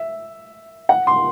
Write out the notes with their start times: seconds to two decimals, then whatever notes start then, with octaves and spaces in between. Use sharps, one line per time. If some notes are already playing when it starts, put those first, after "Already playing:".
Already playing: E5
0.89 F#5
1.07 C6